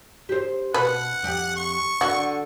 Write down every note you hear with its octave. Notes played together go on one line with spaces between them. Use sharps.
G4 C5
B2 B4 F#5
F2 G4
C#6
D3 F#4